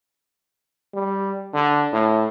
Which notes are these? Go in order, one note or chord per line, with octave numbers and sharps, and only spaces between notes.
G3
D3
A2